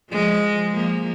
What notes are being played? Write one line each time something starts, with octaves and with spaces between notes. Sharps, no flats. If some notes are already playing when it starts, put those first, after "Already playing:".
F3 G#3
F3 A#3